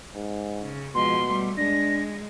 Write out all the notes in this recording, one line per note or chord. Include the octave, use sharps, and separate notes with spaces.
G#2
C#3
B2 F3 G#3 C6
G3 A3
G#3 D4 A#6